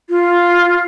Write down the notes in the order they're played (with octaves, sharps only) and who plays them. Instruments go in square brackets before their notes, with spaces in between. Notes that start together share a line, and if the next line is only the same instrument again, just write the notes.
[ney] F4